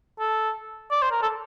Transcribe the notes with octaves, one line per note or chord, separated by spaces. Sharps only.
A4
D5
C5
A#4
A4